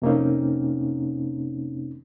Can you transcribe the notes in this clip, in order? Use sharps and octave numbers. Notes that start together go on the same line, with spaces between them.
F2 C3 A#3 C4 C#4 D#4